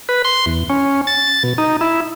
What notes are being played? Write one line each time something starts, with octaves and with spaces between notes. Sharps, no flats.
B4
C6
E2
C#4
A6
B2
D#4
E4